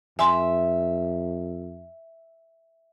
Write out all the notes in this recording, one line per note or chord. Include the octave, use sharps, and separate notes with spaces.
F2 E5 G#5 C6